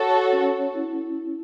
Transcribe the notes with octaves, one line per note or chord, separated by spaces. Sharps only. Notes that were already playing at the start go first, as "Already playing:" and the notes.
Already playing: F#4 A4 C#5
C#4
E4